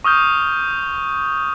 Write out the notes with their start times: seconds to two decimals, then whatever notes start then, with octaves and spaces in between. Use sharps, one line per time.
0.04 C#6 D#6 F6 G6